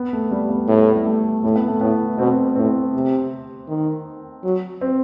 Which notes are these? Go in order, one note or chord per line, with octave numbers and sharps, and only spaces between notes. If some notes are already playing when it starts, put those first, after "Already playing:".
Already playing: B3
A3
G3
B3
A2
G3
A3
A2 A3
B3
A3
A2 B3
B2 C4
A2 C4
C3
D#3
F#3
C4